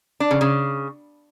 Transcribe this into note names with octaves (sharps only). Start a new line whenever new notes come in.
D4
C#3
C#3